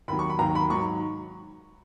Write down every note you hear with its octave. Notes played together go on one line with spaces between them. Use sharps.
D#2 D#3 F#3 B5
C#6
B5
D#2 D#3 F#3 A#5
B5
G#2 F#3 C#6